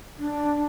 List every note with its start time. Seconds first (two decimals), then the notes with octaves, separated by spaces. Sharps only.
0.19 D4